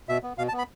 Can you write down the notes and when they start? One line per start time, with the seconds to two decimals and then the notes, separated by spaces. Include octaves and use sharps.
0.08 B2 E5
0.23 B3
0.38 B2 F5
0.48 A5
0.53 B3
0.58 B5